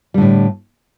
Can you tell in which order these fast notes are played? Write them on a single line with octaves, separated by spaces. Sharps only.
G3 D3 A2